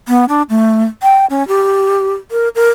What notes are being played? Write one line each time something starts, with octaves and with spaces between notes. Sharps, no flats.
B3
D4
A3
G5
C#4
G4
A#4
A#4